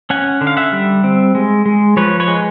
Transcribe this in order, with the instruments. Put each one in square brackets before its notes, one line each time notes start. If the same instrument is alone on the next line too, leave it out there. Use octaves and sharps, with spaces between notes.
[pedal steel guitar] C#4 F#5 G#5
D3
F5
E5 F#5
G3
C4
G#3
G#3
F3 B4 C#5
B4 C#5
G#3